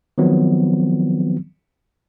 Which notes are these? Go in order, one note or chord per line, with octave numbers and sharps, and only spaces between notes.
D#3 F3 F#3 B3 C4